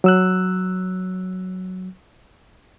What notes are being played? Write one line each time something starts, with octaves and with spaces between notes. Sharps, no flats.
F#3 E6 F#6